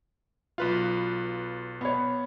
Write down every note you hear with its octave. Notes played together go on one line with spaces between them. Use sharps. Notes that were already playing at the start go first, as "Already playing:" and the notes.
B1 F4 B4 F5
B3 C#5